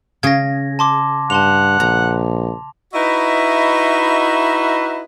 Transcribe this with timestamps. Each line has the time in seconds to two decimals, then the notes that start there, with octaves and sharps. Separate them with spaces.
0.23 C#3 G#4 G#6 A#6
0.79 A5 C6 D6
1.30 G2 F#5 A5 C6 F7
1.80 A#1 A#5
2.93 D#4 E4 F#4 B4 D#5 E5